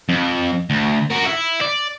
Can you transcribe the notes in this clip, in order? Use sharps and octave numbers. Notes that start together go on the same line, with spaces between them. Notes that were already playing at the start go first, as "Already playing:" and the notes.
F2
D2
F#4 A#4
E4
D5